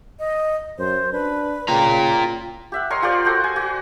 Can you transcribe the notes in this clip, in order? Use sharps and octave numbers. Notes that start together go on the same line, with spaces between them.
D#5
F#2 C5
D4 B4
C#3 F4 G5 A#5
G4 E5 F#5
A#4 C#5 D#5 C6
F4 G4 C5 D5
F#4 A4 C5 G5
G#5
F#4